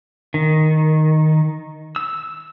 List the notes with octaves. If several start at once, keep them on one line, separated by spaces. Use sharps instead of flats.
D#3
E6